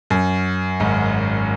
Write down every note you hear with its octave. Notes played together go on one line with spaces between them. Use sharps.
F#2
G#1 G#2